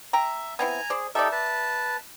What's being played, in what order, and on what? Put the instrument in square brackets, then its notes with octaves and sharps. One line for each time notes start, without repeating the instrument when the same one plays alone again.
[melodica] E5 [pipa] G5 A#5
[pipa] B3 C4 E4 [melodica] G#5 A#5
[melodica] G#4 [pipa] C5 D5
[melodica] D#4 G4 A4 [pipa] D5 E5
[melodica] B4 A5